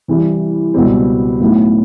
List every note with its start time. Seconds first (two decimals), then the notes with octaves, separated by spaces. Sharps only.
0.08 C3 E3 G3
0.74 C#2 B2 G3 C4
1.40 A2 F#3 B3 D#4